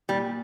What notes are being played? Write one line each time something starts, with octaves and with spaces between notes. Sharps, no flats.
A#2 G3